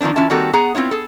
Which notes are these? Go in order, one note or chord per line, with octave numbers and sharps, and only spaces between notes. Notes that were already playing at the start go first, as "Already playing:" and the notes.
D#3 F3 B3 C4 D4
E3 C#4 F4 E5 A5
D#3 G3 A#3 C4 F#4 A4
B3 G#4 F#5 A#5
B3 C4 E4 F4 C#5
G#4 A4